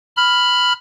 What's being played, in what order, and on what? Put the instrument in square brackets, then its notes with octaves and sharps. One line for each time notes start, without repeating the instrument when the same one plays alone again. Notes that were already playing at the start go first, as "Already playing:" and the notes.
[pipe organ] B5 F6